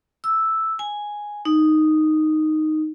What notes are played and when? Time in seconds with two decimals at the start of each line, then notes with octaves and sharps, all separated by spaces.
0.24 E6
0.79 G#5
1.45 D#4